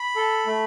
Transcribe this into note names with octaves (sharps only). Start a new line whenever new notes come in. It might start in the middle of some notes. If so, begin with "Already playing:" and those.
Already playing: B5
A4
A3